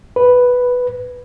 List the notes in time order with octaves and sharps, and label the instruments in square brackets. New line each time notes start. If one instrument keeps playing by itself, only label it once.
[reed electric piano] B4